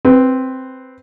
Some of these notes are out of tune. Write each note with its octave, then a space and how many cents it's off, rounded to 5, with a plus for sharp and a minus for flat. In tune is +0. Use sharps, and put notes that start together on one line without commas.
C4 +0 B4 +10